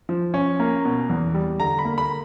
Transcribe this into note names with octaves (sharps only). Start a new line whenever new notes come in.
F3
C#4
A#3
B2
E2
G3
D3 A#5
B5
A#3
B5